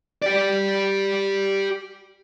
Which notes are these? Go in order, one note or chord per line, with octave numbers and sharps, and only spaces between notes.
G4 D5